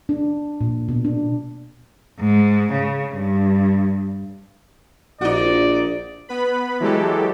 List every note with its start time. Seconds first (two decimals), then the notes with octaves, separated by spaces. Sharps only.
0.09 D4
0.61 A#2
0.89 B2
1.05 D4
2.19 G#2
2.72 C#3
3.16 G2
5.21 A#1 D#4 F#4 D5
6.29 B3 B4 B5
6.80 E3 F#3 G#3 G4 A4